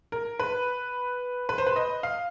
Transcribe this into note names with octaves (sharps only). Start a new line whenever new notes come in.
A#4
B4
B4
C5
B4
D#5
F5